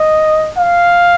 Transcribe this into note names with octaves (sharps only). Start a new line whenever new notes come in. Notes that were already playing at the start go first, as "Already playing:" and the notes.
Already playing: D#5
F5